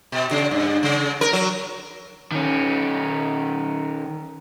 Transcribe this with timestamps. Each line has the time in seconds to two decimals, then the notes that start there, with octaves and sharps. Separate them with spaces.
0.12 B2
0.31 C#3
0.51 G2
0.83 C#3
1.21 A#4
1.33 F#3
2.32 D#3 C#4